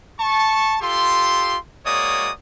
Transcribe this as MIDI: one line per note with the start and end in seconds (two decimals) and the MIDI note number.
0.19 0.76 81
0.19 0.76 85
0.81 1.56 65
0.81 1.56 67
0.81 1.56 69
0.81 1.56 84
1.85 2.30 56
1.85 2.30 58
1.85 2.30 66
1.85 2.30 73
1.85 2.30 74
1.85 2.30 87